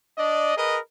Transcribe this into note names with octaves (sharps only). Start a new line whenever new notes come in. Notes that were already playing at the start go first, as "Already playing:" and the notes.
D4 D5 D#5
G#4 A#4 B4 D#5